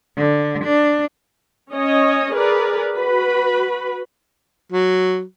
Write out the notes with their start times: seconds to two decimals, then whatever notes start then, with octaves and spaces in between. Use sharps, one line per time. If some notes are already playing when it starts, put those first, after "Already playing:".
0.17 D3
0.65 D4
1.70 C#4 C#5 D#5
2.33 G#4 A#4 B4 D5
2.94 F#4 B4 B5
4.72 F#3